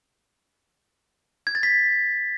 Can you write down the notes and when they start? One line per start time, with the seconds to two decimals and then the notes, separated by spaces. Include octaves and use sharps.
1.47 G#6
1.55 A6
1.63 B6